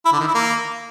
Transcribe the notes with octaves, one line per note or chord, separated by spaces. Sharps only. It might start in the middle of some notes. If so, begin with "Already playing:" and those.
E4
D3
D#3
E4
A#3